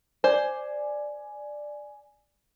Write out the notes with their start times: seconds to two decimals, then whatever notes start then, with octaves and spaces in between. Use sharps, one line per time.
0.24 C5 D5 G#5